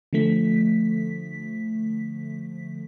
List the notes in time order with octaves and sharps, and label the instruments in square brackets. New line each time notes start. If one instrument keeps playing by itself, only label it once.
[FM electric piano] D3 F3 A3 B6